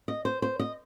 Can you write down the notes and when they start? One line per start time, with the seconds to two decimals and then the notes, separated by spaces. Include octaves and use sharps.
0.08 D#5
0.25 C5
0.42 C5
0.60 D#5